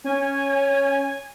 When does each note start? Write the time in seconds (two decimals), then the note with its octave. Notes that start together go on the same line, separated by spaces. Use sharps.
0.04 C#4 C#5 G#5